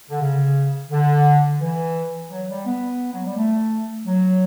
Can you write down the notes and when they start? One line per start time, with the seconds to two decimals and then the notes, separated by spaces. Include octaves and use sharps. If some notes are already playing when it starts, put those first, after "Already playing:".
0.08 D3
0.20 C#3
0.91 D3
1.60 E3
2.30 F#3
2.48 G3
2.65 B3
3.13 F#3
3.24 G3
3.36 A3
4.05 F#3